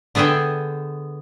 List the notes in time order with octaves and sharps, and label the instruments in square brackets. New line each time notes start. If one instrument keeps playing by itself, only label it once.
[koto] D3 B3 G#4 E5 G5